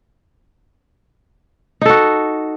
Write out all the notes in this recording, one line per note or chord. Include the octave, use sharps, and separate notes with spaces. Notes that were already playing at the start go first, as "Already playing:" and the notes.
D#4 F#4 A4